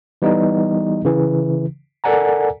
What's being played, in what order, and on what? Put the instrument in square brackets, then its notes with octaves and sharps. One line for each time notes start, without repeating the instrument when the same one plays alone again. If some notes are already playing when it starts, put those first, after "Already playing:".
[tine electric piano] E3 G3 B3 D#4 D#5
C#3 E3
A4 A#4 D5 F#5 G#5 A#5